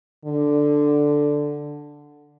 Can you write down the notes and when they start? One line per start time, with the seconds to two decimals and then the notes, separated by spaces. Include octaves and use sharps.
0.25 D3